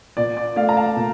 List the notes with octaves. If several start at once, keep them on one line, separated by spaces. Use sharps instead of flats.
A#2 D5
D5
A3 D5 F5
A#5
F5 A5
A#2